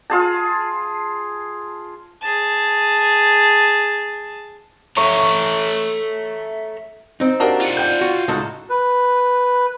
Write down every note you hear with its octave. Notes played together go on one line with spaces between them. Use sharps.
F4 G#4 A5
G#4 A5
A4 C#5 E5 A#5
C4 D#4
A#3 D4 F#4 G4
F4 F#5
D5 G5 G6
F#4
C#2 A2 D#4 F#4 A4
B4